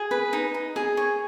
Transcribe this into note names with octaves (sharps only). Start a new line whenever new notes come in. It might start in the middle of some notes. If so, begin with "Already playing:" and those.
Already playing: G#4
B4
D#4
D#4
G#4
C#5